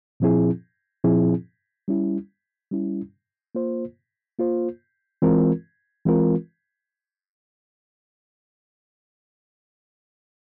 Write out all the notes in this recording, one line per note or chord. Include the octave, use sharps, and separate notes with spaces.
A#2 F3 C4 E4 G#4
A#2 F3 C4 E4 G#4
G3 C#4 E4
G3 C#4 E4
A#3 F4 C5
A#3 F4 C5
E3 G#3 C4 F4 A#4
E3 G#3 C4 F4 A#4